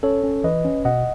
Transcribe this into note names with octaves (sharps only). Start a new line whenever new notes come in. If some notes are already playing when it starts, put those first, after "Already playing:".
C#4 A4 C#5
C#4
E3 B4 D#5
C#4
B2 D#5 F#5